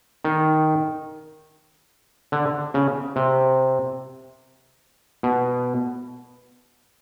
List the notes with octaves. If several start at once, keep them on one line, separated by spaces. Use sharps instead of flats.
D#3
D3
C#3
C3
B2